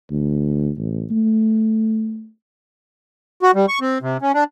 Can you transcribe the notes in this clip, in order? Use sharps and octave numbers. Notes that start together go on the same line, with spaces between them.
D2
A1
A3
F#4
G3
C#6
C4
C3
C#4
D4